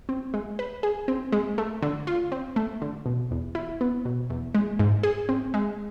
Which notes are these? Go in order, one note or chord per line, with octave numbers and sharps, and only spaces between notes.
C4
G#3
B4
G#4
C4
G#3
A3
D3
F4
C4
A3
D3
B2
E2
E4
B3
B2
E2
G#3
G#2
G#4
C4
G#3